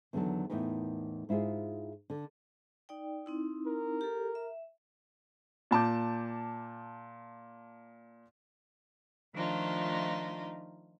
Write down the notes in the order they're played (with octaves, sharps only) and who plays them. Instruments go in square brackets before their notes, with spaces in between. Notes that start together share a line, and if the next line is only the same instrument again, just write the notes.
[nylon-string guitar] E2 D3 D#3 F3 F#3 A4
E2 A2 D#4 A#4 B4
G#2 E4 F4 G#4
D3
[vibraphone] D#4 D5 G5
C4 D#4 E4
[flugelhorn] A#4
[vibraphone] G4 A4
E5
[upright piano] A#2 A5 D6 G6
[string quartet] D#3 F3 A3 D4 D#4 F4